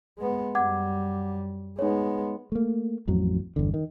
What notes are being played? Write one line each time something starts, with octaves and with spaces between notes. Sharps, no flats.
G#3 B3
F#2 G3 F#5 D6 G#6
G#3 B3 D#4 C#5
A3 A#3
A1 F2 F#3
G1 E2 D3
D#3